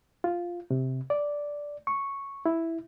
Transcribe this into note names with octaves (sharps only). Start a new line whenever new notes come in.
F4
C3
D5
C#6
E4